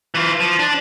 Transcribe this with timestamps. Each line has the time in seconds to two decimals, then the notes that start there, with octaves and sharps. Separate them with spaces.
0.15 E3 F4
0.40 F3
0.59 D4